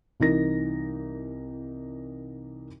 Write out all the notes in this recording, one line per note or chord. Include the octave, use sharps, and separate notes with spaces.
C2 E3 D#4 A#4 A#6